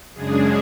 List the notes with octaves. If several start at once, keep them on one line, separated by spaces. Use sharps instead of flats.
F#2 C#3 G#3 D4 G#4